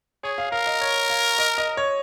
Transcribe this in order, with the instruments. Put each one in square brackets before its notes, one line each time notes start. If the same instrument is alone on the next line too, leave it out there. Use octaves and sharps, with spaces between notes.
[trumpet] G#4 [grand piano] C#5
[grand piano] F5
[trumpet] A#4 [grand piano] F5
[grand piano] D#5
C#5
F5
D#5
D#5
C#5